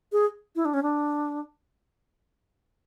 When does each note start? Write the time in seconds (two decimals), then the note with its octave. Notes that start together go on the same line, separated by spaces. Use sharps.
0.12 G#4
0.56 E4
0.65 D4
0.74 C#4
0.82 D4